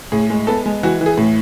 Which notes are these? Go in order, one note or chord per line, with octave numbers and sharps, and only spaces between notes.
A2 G#4
G#3
B3 A4
G#3
E3 F#4
E3
G#4
A2